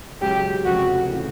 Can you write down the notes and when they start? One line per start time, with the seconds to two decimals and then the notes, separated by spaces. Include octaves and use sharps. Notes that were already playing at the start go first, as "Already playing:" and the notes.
0.21 C#2 C#3 F#3 G4
0.65 F1 F2 C#3 F#4
1.10 C#3 E3 A3